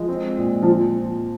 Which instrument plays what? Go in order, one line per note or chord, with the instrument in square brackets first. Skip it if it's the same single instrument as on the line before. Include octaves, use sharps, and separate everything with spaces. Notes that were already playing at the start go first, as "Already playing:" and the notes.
Already playing: [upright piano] F3 [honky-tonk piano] G#3
[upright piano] C4
A#2
[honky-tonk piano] F3